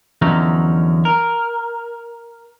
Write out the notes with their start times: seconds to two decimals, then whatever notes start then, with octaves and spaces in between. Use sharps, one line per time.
0.22 E2 D3 F3 F#3 C#4 D#4
1.05 A#4